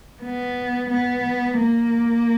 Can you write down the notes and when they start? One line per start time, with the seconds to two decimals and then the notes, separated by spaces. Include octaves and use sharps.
0.22 B3
0.90 B3
1.59 A#3